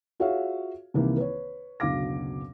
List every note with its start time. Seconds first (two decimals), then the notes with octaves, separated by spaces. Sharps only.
0.20 F4 F#4 G#4 C#5 E5 F5
0.94 C2 C3 D#3 E3 A#3
1.17 B4 C#5
1.80 F#1 D2 B2 F5 D6 A#6